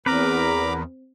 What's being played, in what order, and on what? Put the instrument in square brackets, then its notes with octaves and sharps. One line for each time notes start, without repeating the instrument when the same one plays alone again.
[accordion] E2 [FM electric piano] C4 [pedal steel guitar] A#4 B4 [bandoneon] A#5 B5 D6